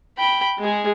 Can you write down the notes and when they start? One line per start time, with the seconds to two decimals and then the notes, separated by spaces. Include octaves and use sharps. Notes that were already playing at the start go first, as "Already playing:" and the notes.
0.18 G5 B5
0.59 G#3 G#4